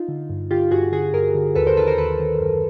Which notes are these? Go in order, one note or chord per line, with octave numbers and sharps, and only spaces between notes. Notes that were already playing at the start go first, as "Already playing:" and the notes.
Already playing: D#4 F4
D3
G2
D3 F4 G4
G2 F#4 G#4
D3 F#4 G#4
G2 G#4 A#4
D3
D#2 A4 B4
A#4 C5
D#3 A4 B4
A#4 C5
D#2 A4 B4
D#3
F#2